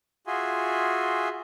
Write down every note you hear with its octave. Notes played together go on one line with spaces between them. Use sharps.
F4 F#4 G#4 E5 G#5 C6